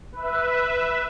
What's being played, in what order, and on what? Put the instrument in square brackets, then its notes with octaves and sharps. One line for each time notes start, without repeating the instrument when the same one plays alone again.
[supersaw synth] B4 E5